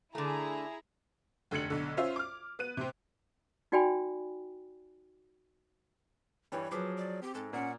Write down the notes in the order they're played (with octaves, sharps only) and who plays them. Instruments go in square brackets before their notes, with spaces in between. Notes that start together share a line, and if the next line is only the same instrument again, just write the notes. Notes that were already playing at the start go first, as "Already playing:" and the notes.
[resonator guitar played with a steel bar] D3 A3 [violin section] E4 G#4 A#5
[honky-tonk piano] F1 D3 G#6 C#7 F#7
B1 D3
C#4 F4 C5 E5
D6 F6
B3 F#6 D#7
C3 C4
[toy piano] D#4 F#4 D5 G5 G#5 B5
[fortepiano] G2 E3 G3 [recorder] C#5
[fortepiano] F3 G#4 D6 [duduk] F#3 [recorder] B4
[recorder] D5
[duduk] C4 [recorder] G4
[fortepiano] G#2 [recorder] A4
[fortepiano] A#2 [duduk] C#4 [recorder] F#5